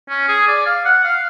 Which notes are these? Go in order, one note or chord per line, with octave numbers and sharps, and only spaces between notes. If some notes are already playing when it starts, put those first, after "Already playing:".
C#4
G#4
D5
F5
F#5
F5